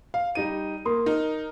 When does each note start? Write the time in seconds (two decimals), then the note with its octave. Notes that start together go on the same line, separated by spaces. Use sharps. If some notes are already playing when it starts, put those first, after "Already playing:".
0.14 F5
0.35 G3 D#4 D#7
0.85 A#3 C6 D#6
1.06 D#4 A#4